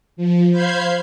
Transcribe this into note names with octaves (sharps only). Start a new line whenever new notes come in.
F3
C5 F5 B5 G6 G#6 C7